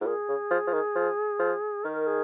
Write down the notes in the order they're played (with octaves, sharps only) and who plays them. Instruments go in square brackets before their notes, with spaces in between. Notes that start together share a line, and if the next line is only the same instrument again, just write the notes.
[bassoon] G#2 [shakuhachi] F4
[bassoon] A#2 [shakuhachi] G#4
[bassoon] C#3
F3
F3
D#3
F3
F3
[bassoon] D#3 [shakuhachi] A#4
[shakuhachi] G#4